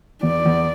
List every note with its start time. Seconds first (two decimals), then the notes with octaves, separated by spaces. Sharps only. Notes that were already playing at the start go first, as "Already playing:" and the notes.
0.23 E2 D5
0.46 E2